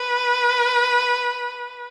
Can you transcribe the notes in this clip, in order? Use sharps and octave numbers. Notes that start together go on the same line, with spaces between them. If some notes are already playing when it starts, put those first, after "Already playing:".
Already playing: B4